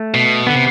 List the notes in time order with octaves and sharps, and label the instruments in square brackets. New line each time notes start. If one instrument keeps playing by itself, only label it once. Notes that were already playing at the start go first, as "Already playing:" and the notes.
Already playing: [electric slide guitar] A3
[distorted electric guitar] B2
[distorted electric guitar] D3 [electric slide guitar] B3
[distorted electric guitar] C3